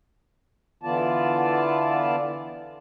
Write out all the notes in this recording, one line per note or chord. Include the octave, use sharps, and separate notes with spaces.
D3 E3 B3 F4 D5 A5